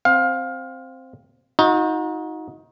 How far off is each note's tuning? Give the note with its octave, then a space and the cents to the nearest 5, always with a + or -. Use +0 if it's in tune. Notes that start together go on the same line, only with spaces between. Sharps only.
C4 +0 F5 +20
D#4 +20 F#4 -35